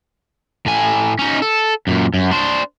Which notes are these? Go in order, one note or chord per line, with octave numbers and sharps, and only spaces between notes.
A2 G#5
C#4 D#4
A4
F#2 A#2
F#2
D4 C5